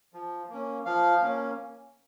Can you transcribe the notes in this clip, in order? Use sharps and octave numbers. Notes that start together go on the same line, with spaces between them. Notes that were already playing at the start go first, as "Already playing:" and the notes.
F3
A#3 C#4
F3 F5
A#3 C#4